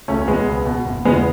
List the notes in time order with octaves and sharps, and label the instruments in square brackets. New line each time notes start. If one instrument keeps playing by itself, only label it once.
[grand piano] C#2 A3 C#4
C#4
B2 G#3 B3
C#2
B2
F#1
E2 C#3 E3 G#3 B3